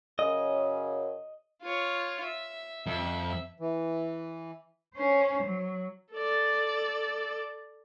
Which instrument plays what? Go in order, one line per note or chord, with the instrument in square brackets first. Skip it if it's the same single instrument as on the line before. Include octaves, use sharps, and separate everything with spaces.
[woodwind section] F#2 C#3 [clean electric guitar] D#5
[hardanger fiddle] F4 C#5
E5
[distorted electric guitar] F2 [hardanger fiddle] E5
[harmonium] E3
[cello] C#4 C5
F#3
[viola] A4 D5